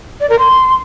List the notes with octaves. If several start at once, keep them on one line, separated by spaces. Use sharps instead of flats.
D5
A#4
C6